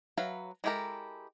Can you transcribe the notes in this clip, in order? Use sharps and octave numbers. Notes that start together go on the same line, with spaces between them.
F#3 B4 E5 F5
G#3 E4 G4 A4 A#4